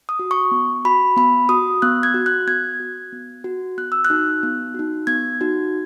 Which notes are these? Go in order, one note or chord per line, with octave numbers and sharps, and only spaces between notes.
D#6
F#4
C#6
B3
F#4 B5
B3 B5
F#4 D#6
B3 F#6
G#6
F#4
F#6
B3 G#6
F#4
B3
F#4
B3 F#6
E6
F#6
D#4 F#4
B3
D#4 F#4
B3 G#6
D#4 F#4